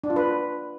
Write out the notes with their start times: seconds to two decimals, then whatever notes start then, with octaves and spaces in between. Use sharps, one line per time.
0.04 D4
0.10 F4
0.16 B4